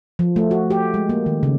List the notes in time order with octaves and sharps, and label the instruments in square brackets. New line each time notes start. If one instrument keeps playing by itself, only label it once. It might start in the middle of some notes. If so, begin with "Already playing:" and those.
[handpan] F3
A3
F#4
G4
G#3
A#3
D#3
C#3